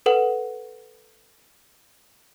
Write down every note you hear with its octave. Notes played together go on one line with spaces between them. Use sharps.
A4 B4 F#5